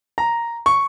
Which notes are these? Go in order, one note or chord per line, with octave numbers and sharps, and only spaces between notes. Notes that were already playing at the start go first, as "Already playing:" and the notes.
A#5
C#6